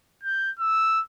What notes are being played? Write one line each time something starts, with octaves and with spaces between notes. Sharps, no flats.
G6
E6